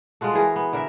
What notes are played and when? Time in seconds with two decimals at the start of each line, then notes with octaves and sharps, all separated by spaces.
0.21 G#3 F4 F#4 A4
0.33 E3 G#4 A#4
0.56 B3
0.73 D3 A#4 E5